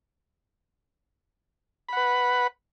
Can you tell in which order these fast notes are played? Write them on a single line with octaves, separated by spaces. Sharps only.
B5 F#5 B4